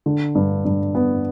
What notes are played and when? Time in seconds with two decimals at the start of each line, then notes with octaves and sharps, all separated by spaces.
0.06 D3
0.35 G2
0.65 G2
0.95 B3